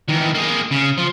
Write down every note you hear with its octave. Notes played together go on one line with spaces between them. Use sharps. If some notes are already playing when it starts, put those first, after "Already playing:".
D#3 E3
A#3 G#4
C#3
F3